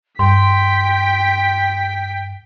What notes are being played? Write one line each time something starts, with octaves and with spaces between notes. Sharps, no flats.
G2 G5 C6 B6